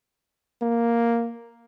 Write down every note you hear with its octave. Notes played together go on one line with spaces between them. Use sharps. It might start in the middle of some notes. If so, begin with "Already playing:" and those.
A#3